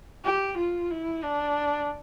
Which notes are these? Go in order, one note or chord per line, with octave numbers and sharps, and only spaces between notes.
G4
F4
E4
D4